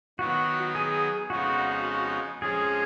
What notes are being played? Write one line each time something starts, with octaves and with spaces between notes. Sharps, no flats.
D#3 F#3 B3 F#4
G#4
F2 C#3 G#3 B3 D#4 F#4
F2 F3 G#3 C#4 F4 G#4